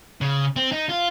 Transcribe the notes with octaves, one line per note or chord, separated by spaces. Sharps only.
C#3
C4
D#4
F4